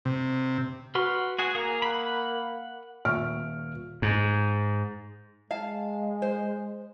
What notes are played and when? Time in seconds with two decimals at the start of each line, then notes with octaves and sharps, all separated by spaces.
0.05 C3
0.95 F#4 B4 C6 F6
1.39 F#4 G#4 F#5
1.55 A#3 G#4 A#5
1.82 F#5 B5
3.05 D#1 E5 C#6 F6 D7
4.02 G#2
5.51 G#3 F5 A5
6.22 C5